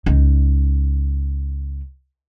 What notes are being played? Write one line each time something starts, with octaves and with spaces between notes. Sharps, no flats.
C#2 D#4